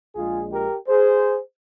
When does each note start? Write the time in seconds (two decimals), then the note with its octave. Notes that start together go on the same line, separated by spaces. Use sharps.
0.15 A#1 A#2 G#3 F4 G#4
0.51 G4 A#4
0.88 G#4 C5